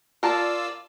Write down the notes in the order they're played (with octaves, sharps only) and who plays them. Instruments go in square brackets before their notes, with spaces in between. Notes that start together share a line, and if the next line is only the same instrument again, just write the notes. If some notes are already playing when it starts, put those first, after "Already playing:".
[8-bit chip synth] F4 D5 E6 [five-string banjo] A#4 A5